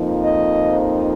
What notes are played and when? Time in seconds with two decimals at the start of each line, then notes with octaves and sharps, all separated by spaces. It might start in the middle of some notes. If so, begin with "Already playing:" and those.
Already playing: F2 F3 A#3 D#4
0.22 D#5